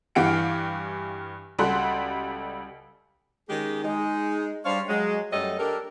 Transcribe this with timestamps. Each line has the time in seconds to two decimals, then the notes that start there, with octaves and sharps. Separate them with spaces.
0.15 G2 E3 G4 F5 C#7 D7
1.59 C#2 G3 F#4 A4 C6 F#6
3.49 D#3 G#3 C#4 G4 G#4
3.84 G#3 D#4
4.66 G3 D4 C5 C#5 F5
4.89 F#3 G#3
5.33 F#2 G3 A3 A4 C#5 D#5
5.60 D4 G4 A4 A#4